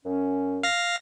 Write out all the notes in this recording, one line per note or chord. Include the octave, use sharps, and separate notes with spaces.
F#2 C#4
F5 A#6